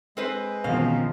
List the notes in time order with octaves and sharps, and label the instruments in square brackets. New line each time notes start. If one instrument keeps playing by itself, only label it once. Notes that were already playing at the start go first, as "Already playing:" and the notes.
[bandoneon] G#3 [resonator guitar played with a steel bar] C4 B4 C5
[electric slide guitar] B2 C4 C#4 [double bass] D#3 F3 [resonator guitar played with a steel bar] F5